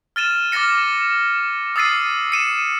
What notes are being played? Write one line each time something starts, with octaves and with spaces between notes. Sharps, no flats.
F6 A6 D#7 E7
D6 F6 A6 A#6 C#7
D#6 E6 A6 C7 D#7
C#7 D#7 E7